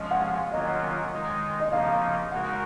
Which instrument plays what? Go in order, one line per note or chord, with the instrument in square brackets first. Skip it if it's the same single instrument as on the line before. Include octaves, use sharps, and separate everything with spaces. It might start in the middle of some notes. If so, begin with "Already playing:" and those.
Already playing: [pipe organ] F3 G#3 C#4 [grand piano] D#5
[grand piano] F#5
F5
[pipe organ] D#3 F#3 A#3 C#4 F4 [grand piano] D#5
[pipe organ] D#3 G#3 D#4
[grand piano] D#5
[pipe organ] C#3 F3 A#3 D#4 [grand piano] F5
[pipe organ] C#3 G#3 D#4 F#4 A#4 [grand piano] F#5